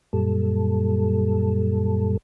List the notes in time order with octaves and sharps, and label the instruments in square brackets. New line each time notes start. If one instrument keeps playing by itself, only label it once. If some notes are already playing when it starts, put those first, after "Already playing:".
[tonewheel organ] F#2 A#2 G3 A4